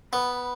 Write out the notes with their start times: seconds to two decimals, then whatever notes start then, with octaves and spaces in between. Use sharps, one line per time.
0.13 B3 B5